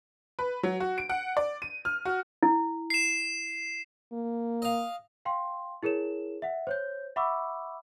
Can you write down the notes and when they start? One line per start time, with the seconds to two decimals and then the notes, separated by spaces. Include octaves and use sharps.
0.39 B4
0.63 F#3
0.80 F#4
0.98 D7
1.10 F#5
1.37 D5
1.62 D#7
1.85 F6
2.05 F#4
2.43 E4
2.90 C7 E7
4.12 A#3
4.62 D#5 F5
5.25 F5 G5 C6
5.83 E4 G#4 A#4 C#5 E7
6.42 E5 F#5
6.67 C5 C#5 G6
7.16 E5 F#5 B5 C#6 D6 E6